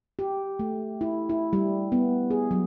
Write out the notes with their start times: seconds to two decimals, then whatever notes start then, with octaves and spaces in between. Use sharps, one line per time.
0.19 G4
0.59 A3
1.01 E4
1.29 E4
1.53 G3
1.92 B3
2.31 G#4
2.51 F#3